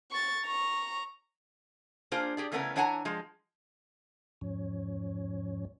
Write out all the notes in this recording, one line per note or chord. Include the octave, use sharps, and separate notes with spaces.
C#6 A6
A#5 C#6
A#3 D4 F4 G#4 C5
G4 G#4 D5
C#3 E3 A3 B3 C#4 A#4
E3 D4 C#5 F#5 G#5 A#5
F3 G#3
E2 G#2 F3 C#4 C#5